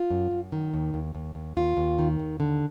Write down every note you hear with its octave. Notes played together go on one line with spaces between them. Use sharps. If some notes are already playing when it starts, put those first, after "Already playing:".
Already playing: F4
F#2
F#2
D#3
D#2
D#2
D#2
D#2
D#2 F4
D#2
D#3
D#2
D3